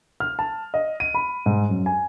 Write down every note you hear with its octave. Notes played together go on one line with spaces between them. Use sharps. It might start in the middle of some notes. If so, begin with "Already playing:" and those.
F6
A5
D#5
D#7
B5
G#2
F#2
G#5